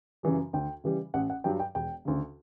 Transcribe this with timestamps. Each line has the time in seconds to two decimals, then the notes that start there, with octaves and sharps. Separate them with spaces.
0.23 F#2 C#3 E3 G3
0.53 D2 G5
0.84 C#3 E3 G3
1.14 A1 F#5
1.30 F#5
1.44 G2 F#3 G5
1.60 G5
1.75 E1 G5
2.05 D2 C#3